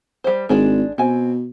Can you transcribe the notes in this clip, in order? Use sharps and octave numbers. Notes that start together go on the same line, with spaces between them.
G3 C5
G#1 G#3 D4 D5
B2 C4 G#5